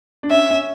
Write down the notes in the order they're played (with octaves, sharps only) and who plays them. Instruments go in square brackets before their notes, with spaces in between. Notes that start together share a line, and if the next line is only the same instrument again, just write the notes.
[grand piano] D4
[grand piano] C#4 [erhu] E5
[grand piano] C#4